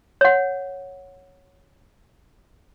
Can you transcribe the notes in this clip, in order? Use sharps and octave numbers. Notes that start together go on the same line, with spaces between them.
C#5 F#5